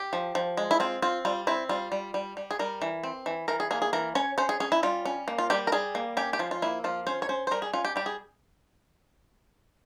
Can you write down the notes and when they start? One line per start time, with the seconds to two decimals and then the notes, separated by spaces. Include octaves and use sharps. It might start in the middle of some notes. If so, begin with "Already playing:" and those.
Already playing: G4
0.13 F3
0.35 F3
0.57 G#3
0.71 E4
0.80 C4 F4
1.02 C4 F4
1.25 G3 F4
1.47 C4 E4
1.69 G3 F4
1.92 G3
2.14 G3
2.37 G3
2.51 G#4
2.59 G3 A#4
2.82 E3
3.04 C4
3.26 E3
3.48 E3 A#4
3.60 G#4
3.71 A#3 G#4
3.82 G#4
3.93 E3 A#4
4.15 C#4 C#5
4.38 C#4 C5
4.49 G#4
4.60 C#4 G#4
4.72 E4
4.83 G3 F4
5.05 C#4
5.28 A#3
5.38 F4
5.50 G3 G4
5.67 A#4
5.72 G3 G#4
5.95 A#3
6.17 C#4 G4
6.33 G4
6.39 F3 F4
6.51 F4
6.62 A#3 E4
6.84 F3 F4
7.07 C#4 C5
7.22 C#5
7.29 C#4 C5
7.47 C5
7.51 G3 A#4
7.62 G#4
7.73 C#4 F4
7.85 G4
7.96 G3 G4
8.06 G#4